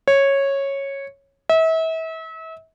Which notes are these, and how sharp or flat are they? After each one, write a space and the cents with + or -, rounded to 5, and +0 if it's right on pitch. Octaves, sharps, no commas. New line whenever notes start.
C#5 -10
E5 -35